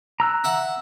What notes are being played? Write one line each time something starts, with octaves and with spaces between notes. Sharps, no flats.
A#5 E6 F#6
E5 F#5